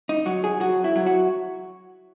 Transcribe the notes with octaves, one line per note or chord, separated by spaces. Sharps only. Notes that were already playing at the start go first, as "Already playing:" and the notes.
D#4
F#3 F#4
G#4
F#3 F#4
E4
F#3
F#4